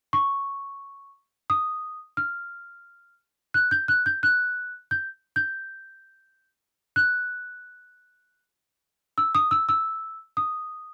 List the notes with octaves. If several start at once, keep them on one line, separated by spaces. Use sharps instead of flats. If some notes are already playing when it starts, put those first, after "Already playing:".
C#6
D#6
F6
F#6
G6
F#6
G6
F#6
G6
G6
F#6
E6
D#6
E6
E6
D#6